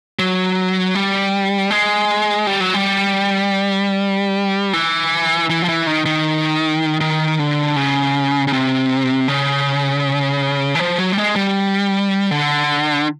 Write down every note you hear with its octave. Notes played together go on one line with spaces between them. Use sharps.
F#3
G3
G#3
G3
F#3
G3
E3
E3
F3
E3
D#3
D#3
D#3
D3
C#3
C#3
C3
C#3
E3
F3
F#3
G3
G#3
G3
D3